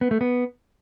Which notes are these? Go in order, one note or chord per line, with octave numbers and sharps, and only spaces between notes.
B3
A3
B3